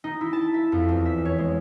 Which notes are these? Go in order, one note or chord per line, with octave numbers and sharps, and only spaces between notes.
D#4
E4
A5
E5
F2
E2
E5
C#5
G#3